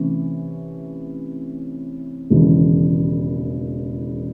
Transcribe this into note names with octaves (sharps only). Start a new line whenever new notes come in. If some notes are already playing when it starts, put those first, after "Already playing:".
Already playing: C3 E3 A3 C#4
E1 D#2 C#3 E3